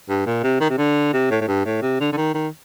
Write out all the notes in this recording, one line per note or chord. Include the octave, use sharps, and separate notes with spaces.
G2
A#2
C3
D#3
C3
D3
C3
A2
A2
G2
A2
C3
D3
D3
D#3
D#3